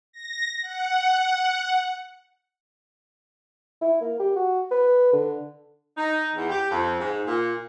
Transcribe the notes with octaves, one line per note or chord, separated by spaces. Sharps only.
A#6
F#5
E4
A#3
G4
F#4
B4
D3
D#4
E2
G4
F2
G#2
A#2